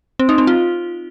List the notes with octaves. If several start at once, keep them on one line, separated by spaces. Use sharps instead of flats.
C4
D#4
C4
F4